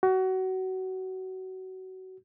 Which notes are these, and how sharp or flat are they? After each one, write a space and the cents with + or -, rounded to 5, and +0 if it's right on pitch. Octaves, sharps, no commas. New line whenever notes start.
F#4 +25